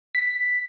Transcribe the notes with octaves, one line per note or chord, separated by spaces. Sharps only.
B6